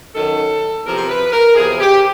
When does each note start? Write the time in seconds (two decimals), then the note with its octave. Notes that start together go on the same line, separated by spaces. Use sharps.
0.15 F#2 D#3 F#3 A4
0.85 E2 C3 F3 A#4
0.98 C5
1.09 B4
1.32 A#4
1.55 E2 C3 F3 G#4
1.79 G4